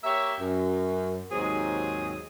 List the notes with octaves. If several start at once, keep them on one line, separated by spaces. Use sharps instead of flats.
A#3 G4 C#5 E5
F#2
D#2 G#2 F#3 G#3 C4 G#4